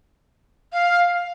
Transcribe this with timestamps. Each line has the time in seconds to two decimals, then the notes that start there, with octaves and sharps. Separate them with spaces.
0.73 F5